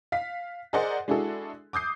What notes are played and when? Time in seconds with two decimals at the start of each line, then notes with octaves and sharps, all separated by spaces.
0.12 F5 B6
0.73 G#4 A#4 C5 D5 D#5 F#5
1.08 G#3 D4 E4 F#4 G#4 A4
1.73 D6 D#6 G6 C7